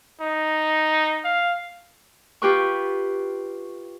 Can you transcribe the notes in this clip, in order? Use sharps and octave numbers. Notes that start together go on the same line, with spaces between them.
D#4
F5
F4 G4 B4 C#6